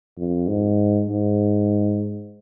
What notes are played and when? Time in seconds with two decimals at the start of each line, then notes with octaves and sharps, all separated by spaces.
0.17 F2
0.48 G#2
1.09 G#2